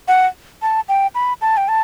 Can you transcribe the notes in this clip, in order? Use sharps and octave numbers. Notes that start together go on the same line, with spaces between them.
F#5
A5
G5
B5
A5
G5
A5